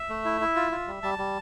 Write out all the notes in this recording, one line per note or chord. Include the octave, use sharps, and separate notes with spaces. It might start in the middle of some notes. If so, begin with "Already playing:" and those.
Already playing: E5
A3
E4
E4
F4
F4
G3
G3 A5
G3